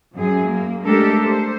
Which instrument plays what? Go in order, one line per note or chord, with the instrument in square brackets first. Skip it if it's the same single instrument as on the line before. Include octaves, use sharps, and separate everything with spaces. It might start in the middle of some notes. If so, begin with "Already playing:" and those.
[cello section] F#2 G#4
A#3
G#3 A3 D4 G4 A4 A#4
C5